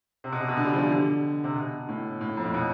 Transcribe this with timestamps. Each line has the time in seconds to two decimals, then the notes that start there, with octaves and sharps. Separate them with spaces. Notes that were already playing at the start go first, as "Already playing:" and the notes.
0.24 C3
0.32 B2
0.40 C3
0.49 B2
0.57 D3
0.65 G3
0.73 F3
0.81 E3
0.89 D3
1.44 C3
1.55 B2
1.89 A2
2.21 A2
2.37 F2
2.45 A2
2.54 B2